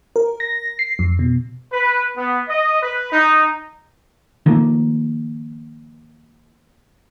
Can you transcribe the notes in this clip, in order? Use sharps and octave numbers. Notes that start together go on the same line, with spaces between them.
A#4
A#6
C7
F2
B2
B4
B3
D#5
B4
D#4
D#3 F3 A3 A#3